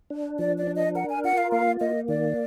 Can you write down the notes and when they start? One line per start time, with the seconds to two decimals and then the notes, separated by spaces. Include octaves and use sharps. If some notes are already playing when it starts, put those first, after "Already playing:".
0.10 D4
0.39 F3 D5
0.58 D5
0.67 D4
0.76 D#5
0.95 A#4 F#5
1.09 G#5
1.24 F4 F#5
1.37 F5
1.52 A#3 F5
1.80 A#3 D#5
2.08 D#3 D5